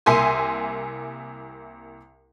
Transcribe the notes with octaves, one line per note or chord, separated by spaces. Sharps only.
C2 A#3 E5 G#5 C6